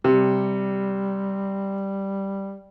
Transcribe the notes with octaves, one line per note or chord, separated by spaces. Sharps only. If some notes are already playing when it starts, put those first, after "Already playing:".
C3 G3